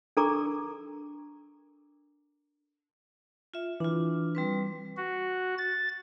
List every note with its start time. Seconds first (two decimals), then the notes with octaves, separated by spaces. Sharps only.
0.17 D4 A4 A#4 A#5 C#6 D6
3.54 F4 E5
3.80 E3 D4 F4
4.35 G3 C4 B4
4.97 F#4
5.58 A6